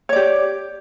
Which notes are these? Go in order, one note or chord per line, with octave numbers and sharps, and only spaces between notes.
G4 C#5 D5